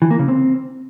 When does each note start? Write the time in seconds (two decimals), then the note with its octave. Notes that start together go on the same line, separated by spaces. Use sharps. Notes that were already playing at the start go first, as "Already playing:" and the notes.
0.02 E3
0.11 A#3
0.19 C#3
0.28 C4